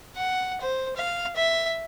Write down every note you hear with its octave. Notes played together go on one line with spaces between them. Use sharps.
F#5
C5
F5
E5